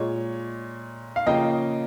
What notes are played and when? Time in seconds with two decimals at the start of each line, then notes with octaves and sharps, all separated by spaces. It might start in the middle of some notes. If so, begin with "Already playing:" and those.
Already playing: A#2 G#3 C#5
1.16 F5
1.26 C#3 F3 A#3 D#5 G5